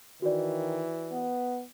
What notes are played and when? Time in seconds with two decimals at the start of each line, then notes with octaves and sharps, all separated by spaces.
0.22 D#3 E3 F#4 D5
1.12 B3